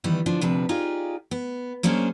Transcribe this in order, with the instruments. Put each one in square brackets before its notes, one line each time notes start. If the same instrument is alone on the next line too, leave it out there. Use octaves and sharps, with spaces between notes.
[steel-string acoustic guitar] D#3 E3 G3 B3
D3 F3 D4
D2 C3 F3 D4 B4
D#4 F4 G4 G#4 D5
B3
F#3 A#3 C#4 D4 G#4 C5